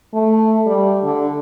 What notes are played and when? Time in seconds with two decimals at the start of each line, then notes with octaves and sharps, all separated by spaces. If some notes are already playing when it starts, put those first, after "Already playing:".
0.14 A3
0.66 G3
1.04 D3